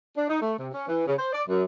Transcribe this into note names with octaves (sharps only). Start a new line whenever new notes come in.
D4
D#4
A3
C3
C#4
E3
C#3
C5
D5
F#2